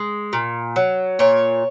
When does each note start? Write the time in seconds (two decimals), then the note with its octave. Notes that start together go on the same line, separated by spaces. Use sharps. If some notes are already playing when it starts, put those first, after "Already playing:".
Already playing: G#3
0.33 A#2
0.76 F#3
1.19 A#2 C#5